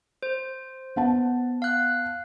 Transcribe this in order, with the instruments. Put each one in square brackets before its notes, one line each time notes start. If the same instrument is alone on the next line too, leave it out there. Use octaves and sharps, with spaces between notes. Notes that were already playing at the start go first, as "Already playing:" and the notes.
[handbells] C5
[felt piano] B3 F#5 A5
[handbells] F5 F#6